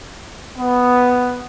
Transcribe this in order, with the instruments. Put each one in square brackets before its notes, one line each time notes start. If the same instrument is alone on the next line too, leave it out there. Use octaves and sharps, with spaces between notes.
[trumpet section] B3